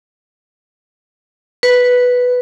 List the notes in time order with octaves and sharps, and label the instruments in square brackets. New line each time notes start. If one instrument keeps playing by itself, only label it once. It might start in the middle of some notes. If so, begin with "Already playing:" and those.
[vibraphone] B4